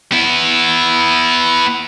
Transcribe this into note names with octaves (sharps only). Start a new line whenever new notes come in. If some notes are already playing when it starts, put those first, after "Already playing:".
B3 E4